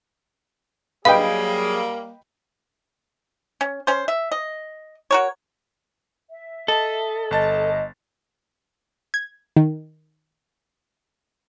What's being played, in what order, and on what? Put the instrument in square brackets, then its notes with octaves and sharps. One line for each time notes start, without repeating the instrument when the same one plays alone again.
[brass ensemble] F#3 G#4 [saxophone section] G3 A#3 [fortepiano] B4 D#5 G5 [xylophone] F5
[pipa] C#4
C#4 C5
E5
D#5
F#4 A#4 C#5
[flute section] E5
[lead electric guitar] A4 [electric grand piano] D#5 A5
[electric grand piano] G1 A5 A6 [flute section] D#5
[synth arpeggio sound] G#6
D#3